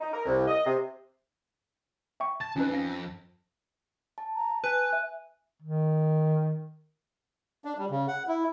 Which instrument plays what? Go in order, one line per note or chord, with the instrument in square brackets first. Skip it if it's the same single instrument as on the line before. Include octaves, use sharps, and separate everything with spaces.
[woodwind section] D#4
A#4
C2
D#5
C3
[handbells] E5 G5 C#6
[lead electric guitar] A5 [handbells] A6
[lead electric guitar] F2 [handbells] C#4 D#4 B4
[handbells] C#4 F5 A#6
[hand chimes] A5
[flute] A#5
[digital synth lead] B4 [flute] G#5
[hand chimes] E5 F#6
[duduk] D#3
[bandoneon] D4
G3
C#3
F#5
E4